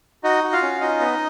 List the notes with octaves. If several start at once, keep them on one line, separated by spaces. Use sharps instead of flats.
D#4 F#4 D#5
F#4
F4 F5
C#4
D#4 F4 D#5
B3